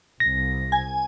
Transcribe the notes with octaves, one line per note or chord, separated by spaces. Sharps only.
C2 A#6
G#5